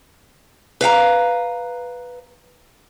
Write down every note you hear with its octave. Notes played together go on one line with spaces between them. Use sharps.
B4 F5 F#5 A#5